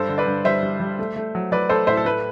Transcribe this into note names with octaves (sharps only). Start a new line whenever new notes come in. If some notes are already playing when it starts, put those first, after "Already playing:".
Already playing: G2 A4 C5
D3
B4 D5
G2
G3 C5 E5
G3
G3
A3
A3
F#3
F#3 B4 D5
A3 A4 C5
A2 C5 E5
A4
A3 B4